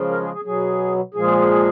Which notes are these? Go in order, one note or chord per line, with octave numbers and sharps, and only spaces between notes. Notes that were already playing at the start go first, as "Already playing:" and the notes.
Already playing: C#3 F3 G#3
A#4
G#4
G#4
B2 F#3 G#4
A#2 F3 G#3 G#4